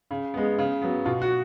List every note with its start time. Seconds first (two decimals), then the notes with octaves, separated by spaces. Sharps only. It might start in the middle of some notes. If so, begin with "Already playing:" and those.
0.11 C#3
0.34 G#3 B3
0.58 C#3
0.82 F#3 B3
1.05 B2 F4
1.22 F#4